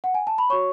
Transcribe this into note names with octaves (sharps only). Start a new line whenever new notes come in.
F#5
G#5
A5
B5
F#4 C#5 C#6